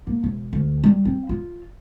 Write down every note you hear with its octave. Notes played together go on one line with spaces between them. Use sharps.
A#3
E1
D2
G3
C4
F4